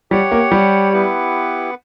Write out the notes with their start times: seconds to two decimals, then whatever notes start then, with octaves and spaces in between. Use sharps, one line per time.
0.11 G3 G4 C#5 F#5
0.31 A#3
0.52 G3
0.93 B3 E4 G4 B4 F#5